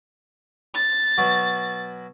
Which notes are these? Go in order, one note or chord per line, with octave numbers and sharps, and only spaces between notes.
A6
B2 F#3